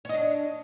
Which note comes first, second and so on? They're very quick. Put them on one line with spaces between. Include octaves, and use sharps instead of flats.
C#5 D#5 D4